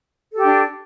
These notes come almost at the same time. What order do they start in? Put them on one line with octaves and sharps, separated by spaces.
A4 G4 D4